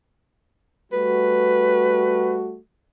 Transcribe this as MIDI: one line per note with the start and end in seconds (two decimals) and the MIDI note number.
0.92 2.58 55
0.92 2.58 57
0.92 2.58 66
0.92 2.36 71